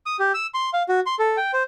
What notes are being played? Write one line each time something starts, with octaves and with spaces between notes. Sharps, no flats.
D#6
G4
E6
C6
F5
F#4
C6
A4
G5
C5